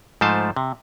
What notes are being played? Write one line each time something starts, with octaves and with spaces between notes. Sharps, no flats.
G#2 F3 A3 C5 A5
C3